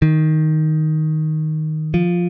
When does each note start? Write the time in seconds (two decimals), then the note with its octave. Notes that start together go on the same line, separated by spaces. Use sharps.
0.02 D#3
1.94 F3